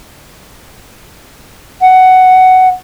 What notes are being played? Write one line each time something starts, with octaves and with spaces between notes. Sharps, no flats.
F#5